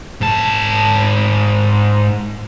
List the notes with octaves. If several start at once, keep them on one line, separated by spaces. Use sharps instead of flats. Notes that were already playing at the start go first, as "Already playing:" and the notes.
G#2 A5